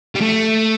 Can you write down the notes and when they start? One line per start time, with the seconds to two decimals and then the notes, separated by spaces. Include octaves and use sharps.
0.15 G3
0.21 A3